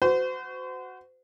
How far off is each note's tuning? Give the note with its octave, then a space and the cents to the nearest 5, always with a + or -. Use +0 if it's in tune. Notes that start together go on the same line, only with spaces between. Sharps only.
F#4 +0 C5 -35